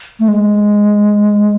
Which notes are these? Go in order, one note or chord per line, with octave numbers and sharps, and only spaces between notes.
A3
G#3